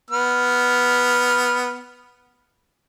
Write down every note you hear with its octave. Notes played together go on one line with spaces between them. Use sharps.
B3 F6